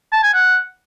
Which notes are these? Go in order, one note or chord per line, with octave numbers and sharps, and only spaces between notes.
A5
G#5
F#5